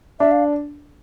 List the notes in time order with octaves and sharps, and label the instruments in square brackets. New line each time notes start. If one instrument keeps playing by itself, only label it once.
[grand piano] D4 [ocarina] E5
[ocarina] F5